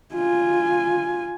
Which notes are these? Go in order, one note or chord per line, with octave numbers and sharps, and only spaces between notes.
F4 G#5